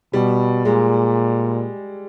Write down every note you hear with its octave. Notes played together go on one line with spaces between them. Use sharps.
B2 G3
A#2 G#3